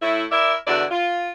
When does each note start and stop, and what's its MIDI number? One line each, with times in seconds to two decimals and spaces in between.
0.02 0.24 45
0.02 0.24 57
0.02 0.24 64
0.31 0.54 64
0.31 0.54 70
0.31 0.54 74
0.31 0.54 76
0.67 0.83 40
0.67 0.83 50
0.67 0.83 64
0.67 0.83 66
0.67 0.83 74
0.91 1.30 65